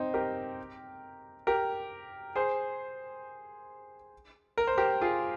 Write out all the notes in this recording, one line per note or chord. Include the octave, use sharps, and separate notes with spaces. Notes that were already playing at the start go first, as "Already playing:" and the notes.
Already playing: C4 D#4
G4 A#4
G4 A#4
G#4 C5
A#4
C5
G4 A#4
F4 G#4